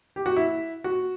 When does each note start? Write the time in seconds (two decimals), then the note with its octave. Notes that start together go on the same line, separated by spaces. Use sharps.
0.16 G4
0.26 F#4
0.37 E4
0.84 F#4